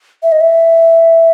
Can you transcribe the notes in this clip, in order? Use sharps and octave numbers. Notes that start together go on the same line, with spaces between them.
E5
D#5
E5